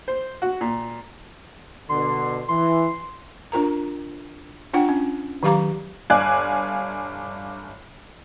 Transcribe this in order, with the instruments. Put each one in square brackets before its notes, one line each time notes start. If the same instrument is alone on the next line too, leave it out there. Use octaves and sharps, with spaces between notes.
[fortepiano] C5
F#4
A#2
[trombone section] B2 D3 [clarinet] C6
[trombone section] E3 [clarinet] C6
[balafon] D4 F4 A#4 A#5
D4 F4 F#5 G5
C#4
D#3 F#3 G4 F5 A#5 D6
[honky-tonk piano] G1 D5 F5 G#5 F#6